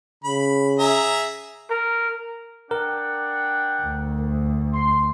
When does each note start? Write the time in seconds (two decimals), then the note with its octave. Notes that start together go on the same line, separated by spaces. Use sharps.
0.24 C#3 B5
0.79 G#4 E5 A#5
1.70 A#4
2.71 D4 A#4 F#5 G5
3.82 D2
4.73 C6